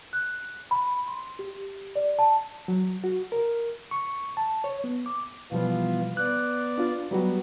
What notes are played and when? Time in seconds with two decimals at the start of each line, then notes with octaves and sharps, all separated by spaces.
0.13 F#6
0.71 B5
1.08 C6
1.39 G4
1.96 D5
2.19 A5
2.68 F#3
3.04 F#4
3.32 A#4
3.91 C#6
4.37 A5
4.64 C#5
4.84 B3
5.06 D6
5.52 B2 E3 F3 G3 B3 F4
6.17 B3 D5 F#6
6.78 D4 F4
7.11 F#3 G3 B3 F#4